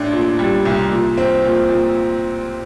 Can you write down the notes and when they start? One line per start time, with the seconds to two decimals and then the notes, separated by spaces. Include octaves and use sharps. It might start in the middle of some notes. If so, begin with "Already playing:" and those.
Already playing: A1 D4
0.12 A#2
0.39 G3
0.65 C2
0.91 A#2
1.18 C4
1.45 A#2
1.70 A#2